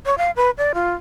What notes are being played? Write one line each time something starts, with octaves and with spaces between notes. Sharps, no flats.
C#5
F5
B4
D5
F4